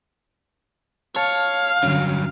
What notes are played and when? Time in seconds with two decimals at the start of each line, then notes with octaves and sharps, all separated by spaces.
1.16 C#5 F5 A5
1.83 G2 D3 F#3 C#4